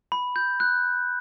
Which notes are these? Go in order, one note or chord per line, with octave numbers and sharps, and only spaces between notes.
B5
G6
F#6